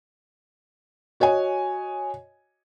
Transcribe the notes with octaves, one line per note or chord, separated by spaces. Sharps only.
F#4 C#5 D#5 G#5